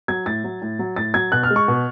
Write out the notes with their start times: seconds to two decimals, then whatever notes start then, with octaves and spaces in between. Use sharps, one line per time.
0.08 F#3 G#6
0.26 A2 A6
0.44 F#3
0.62 A2
0.79 F#3
0.96 A2 A6
1.14 F#3 G#6
1.32 B2 F#6
1.43 F6
1.50 G#3
1.56 C#6
1.68 B2